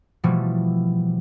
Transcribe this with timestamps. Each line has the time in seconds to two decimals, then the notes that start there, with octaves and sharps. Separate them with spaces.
0.24 B2 E3 F3 G3 A3